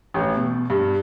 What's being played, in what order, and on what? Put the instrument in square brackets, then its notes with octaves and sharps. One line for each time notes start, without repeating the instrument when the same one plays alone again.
[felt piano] A1
B2
G2